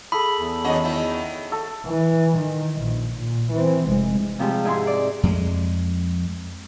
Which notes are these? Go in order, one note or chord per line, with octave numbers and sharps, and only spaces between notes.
G#4 A4 B5 D#6
E2
D#2 F#3 C#4 D#5
D#3 E4
A4
E3
D#3
A#1
A#2
E3 C4
F1 G#3
C3 F3 G3 G#3
G#2 E4 G#4 C6
D5
F2 G#3